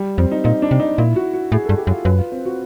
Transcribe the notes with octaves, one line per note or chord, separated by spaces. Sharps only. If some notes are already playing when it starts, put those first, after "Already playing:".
Already playing: G3
F2 C4
D#4
A#2 D#4
D4
C3
D#4
A#2 E4
F#4
F#4
A2 G#4
G2 A4
G4
F#2
F4
F#2 B4
F4
C4
F#4